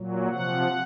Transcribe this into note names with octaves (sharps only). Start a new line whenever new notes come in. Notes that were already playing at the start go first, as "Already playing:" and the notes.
Already playing: A#2 F#3
C3 F3 F#5